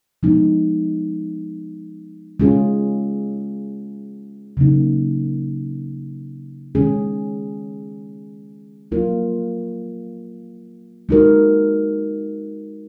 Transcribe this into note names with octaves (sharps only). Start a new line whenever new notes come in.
F3 G#3 B3 D#4
G#3 C#4 F4 G#4
C#3 F#3 A#3 D#4
D#3 G#3 C#4 G#4
F#3 A#3 F4 A#4
G#3 D#4 F#4 A#4